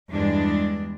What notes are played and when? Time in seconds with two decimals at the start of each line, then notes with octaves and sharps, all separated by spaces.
0.10 E2 G2 E3 G#3 D4